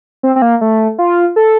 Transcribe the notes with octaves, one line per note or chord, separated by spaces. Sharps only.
C4
C4
A#3
A3
F4
A4